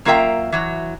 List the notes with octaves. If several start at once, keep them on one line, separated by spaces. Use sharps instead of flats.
F#2 A#3 F4 A#4 E5 G5
E3 F#3 F#4